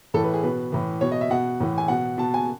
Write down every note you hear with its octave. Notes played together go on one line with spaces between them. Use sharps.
A2 E3 A4
B4
G#4
B2 B4
A2 E3
B2 C#5
D#5
E5
B2 F#5
A2 E3
G#5
B2 F#5
B2 A5
G#5